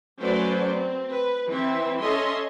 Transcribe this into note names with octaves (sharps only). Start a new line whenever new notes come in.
F#3 A3 C#4 B4 C5 D5
C4
B4
E3 C4 E4 E5
C#4 A4 D#5 E5 C6